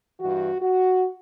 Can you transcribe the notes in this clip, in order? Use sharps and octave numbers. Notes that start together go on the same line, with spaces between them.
G2 E3 F#4
F#4